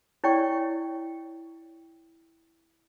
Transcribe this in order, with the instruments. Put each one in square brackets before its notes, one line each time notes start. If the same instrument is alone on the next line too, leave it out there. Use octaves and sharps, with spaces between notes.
[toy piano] E4 C#5 D5 G5 C#6